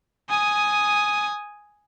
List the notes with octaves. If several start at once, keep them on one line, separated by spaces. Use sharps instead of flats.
G#5 D#6